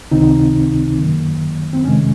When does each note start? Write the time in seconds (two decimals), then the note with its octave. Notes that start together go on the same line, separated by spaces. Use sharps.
0.11 C#2 C3 D#3 C4 D#4
0.98 F#2 D#3 F#3 A#3
1.73 C4
1.84 F2 C3 D#3 G#3 C#4